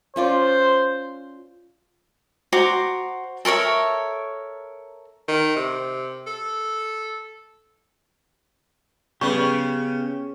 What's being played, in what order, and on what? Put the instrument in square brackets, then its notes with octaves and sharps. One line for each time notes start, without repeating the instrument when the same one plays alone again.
[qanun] C#4 F4 D5 [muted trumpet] C5
[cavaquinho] F#4 C5 A#5 D6
A4 A#4 C#5 E5
[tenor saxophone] D#3
C3
A4
[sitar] C#3 [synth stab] G3 B4 [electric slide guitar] B3 G4 [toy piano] C#6